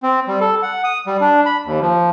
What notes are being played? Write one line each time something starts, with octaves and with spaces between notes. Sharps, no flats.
C4
G3
A4
F#5
D#6
G3
D4
B5
D#2
F3